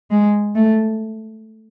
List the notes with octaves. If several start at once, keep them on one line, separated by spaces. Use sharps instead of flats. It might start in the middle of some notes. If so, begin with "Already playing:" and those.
G#3
A3